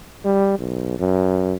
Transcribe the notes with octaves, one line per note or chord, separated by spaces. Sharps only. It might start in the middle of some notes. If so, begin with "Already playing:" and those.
G3
B1
F#2